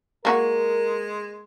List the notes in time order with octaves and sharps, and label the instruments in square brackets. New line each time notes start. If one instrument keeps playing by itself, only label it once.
[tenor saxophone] G#3 [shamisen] A#3 F#4 [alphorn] A#4